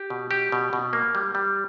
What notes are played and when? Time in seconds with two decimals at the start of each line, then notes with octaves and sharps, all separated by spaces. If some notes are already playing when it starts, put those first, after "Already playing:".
Already playing: G4
0.10 B2
0.31 G4
0.52 B2
0.73 B2
0.93 A#3
1.15 G3
1.35 G3